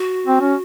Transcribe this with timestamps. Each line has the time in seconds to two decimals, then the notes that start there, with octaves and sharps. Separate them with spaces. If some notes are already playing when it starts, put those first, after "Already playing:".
Already playing: F#4
0.27 C4
0.41 C#4